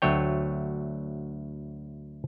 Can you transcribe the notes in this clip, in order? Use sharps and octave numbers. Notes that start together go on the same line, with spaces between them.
D2 F#3 A3 C#5 G5